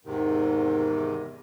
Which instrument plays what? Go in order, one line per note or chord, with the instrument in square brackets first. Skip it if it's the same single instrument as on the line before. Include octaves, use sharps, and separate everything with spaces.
[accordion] E2 G#2 C3 D#3